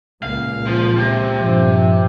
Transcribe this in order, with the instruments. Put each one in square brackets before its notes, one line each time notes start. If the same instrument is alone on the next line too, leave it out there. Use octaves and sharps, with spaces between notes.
[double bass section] C#2 A#2 [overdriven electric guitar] F5
[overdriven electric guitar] F3
C3
[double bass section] G2 A#2 F3